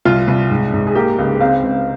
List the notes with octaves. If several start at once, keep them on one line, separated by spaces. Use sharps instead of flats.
C2 F4
C2
G#2
G#2
G#4
A#3 G4
C#2
C4 F5
C#2